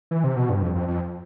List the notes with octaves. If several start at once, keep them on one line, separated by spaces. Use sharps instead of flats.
E3
C3
B2
G2
F2
F2
F2